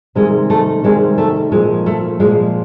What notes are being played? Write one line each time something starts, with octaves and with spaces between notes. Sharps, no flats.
C3 D#3 G3 G#3
A3
C3 D#3 G3 G#3
A3
A#2 F3 G#3
A3
A#2 F3 G#3